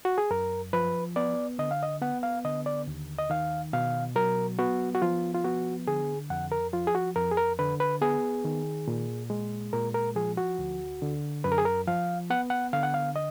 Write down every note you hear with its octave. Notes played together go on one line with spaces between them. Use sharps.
F#4
G#4
F#2 A#4
F3 B4
B3 D5
D3 D#5
F5
D#5
B3 F#5
F5
D3 D#5
D5
D#2
D#5
D#3 F5
B2 F5
F#3 A#4
B3 F#4
F#4
F3 F4
F4
B3 F#4
D3 G#4
F2 F#5
A#4
F3 F4
G#4
F#4
F2 A#4
G#4
A#4
D3 B4
B4
B3 G#4
D#3
A#2
G#3
A#2 A#4
A#4
F3 G#4
F#4
D2
D3
F#2 B4
A#4
G#4
A#4
F3 F5
B3 F#5
F#5
D3 F5
F#5
F5
D#5